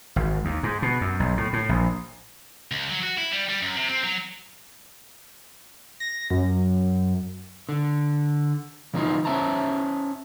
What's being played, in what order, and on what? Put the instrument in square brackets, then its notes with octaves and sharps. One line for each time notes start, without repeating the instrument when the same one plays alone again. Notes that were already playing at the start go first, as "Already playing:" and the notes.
[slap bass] G#1
D#2
G#2
B2
F#2
B1
A2
A2
A#1
[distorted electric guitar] C#2
F#3
F#4
E4
G3
G3
F#2
C3
C4
F#3
[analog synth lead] A#6
F#2
[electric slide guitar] D3
C#3 E3 D#4 F4
C#4 C5 E5 A5 A#5